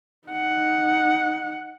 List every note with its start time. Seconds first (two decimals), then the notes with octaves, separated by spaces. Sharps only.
0.28 D#4 F#5